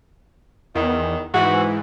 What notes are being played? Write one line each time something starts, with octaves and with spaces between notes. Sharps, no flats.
E2 D#3
G#2 E3 F#4